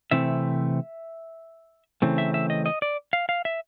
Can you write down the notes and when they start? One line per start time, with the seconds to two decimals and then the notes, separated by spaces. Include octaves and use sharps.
0.11 C3 E3 A3 C4 E5
2.02 C#3 E3 A3 C4
2.18 E5
2.34 E5
2.50 D#5
2.66 D#5
2.82 D5
3.13 F5
3.29 F5
3.45 E5